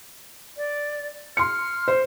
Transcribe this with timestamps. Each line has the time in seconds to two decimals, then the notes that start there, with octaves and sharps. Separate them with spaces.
0.57 D5
1.37 C6 F6 C#7
1.88 C5